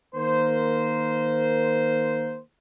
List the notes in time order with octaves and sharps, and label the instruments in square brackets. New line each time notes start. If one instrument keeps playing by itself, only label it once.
[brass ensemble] D#3 A#3 A#4 C5